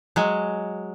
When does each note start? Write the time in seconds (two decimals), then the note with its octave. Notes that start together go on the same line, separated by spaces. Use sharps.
0.16 F#3 G#3